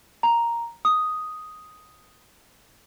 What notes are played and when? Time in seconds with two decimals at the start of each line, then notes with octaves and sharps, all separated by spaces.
0.23 A#5
0.85 D#6